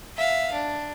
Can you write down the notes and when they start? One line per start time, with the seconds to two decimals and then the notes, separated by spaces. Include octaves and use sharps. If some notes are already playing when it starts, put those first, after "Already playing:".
0.17 E5 F5
0.53 D4